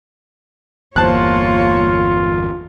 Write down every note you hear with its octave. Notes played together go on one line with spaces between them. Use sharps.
G1 E2 A#3 F4 C5 C#5 A5 F#6